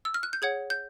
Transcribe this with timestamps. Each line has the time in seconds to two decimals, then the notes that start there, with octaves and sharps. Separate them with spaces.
0.05 E6
0.14 F6
0.23 F#6
0.33 G6
0.42 G#4 C#5 F#5 G#6
0.70 G6